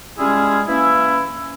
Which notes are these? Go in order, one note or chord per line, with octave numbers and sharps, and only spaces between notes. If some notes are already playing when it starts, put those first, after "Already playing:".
G3 G#3 C#4 E4 F4 G#4
E3 A#3 C#4 E4